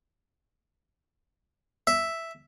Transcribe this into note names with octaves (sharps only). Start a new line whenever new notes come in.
E5